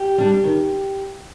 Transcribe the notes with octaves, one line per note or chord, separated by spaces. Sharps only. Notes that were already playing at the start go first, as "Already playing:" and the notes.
Already playing: G4
G3 D4
D#3